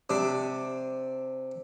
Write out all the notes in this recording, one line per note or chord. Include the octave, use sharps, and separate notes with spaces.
C3 D4